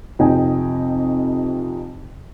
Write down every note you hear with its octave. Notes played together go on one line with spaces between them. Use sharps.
F2 C3 D#4 G5 G#5